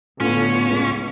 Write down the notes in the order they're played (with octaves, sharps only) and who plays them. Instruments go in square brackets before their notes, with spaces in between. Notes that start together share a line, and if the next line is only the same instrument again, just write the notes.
[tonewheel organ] A2 F4 [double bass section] D3 B3 [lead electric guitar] C#4
[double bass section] C#2